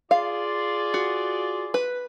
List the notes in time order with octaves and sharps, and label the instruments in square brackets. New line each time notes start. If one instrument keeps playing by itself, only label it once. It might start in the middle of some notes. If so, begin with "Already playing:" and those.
[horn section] F4 G#4 D5 [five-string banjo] F5
[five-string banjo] F#4
B4